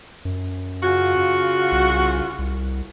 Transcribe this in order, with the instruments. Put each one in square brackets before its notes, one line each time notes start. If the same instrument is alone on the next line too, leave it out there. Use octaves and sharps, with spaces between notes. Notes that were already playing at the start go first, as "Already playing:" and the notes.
[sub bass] F#2
[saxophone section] C#3 F4 F#4
[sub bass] C2
C2